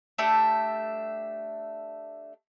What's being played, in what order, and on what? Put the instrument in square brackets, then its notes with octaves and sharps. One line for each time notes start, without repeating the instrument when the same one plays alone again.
[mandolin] A3 D4 G4 E5